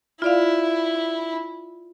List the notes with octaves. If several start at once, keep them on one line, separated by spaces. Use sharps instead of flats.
E4 F4 D5 F5